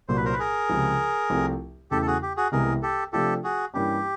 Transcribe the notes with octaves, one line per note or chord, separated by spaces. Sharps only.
C2 A#2 F#3 A#3 C5
B4
A#4 C5
B4
G#4 A#4
C#2 C3 F3
C2 C3 F3 A3 C4
E2 C#3 E3 A3 C#4 G4 A4
A4
F#4 G#4
G4
F#4 G#4
C2 C3 E3 G#3 B3 G#4 A#4
G4 A4
C3 F3 A3 D4 F4 G4 A4
F#4 G#4
G2 E3 G3 A#3 C#4 G4